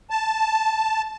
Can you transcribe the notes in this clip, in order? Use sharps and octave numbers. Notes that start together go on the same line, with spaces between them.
A5